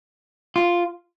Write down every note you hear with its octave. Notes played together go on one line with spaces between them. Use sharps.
F4